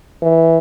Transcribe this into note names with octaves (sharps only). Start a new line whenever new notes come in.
E3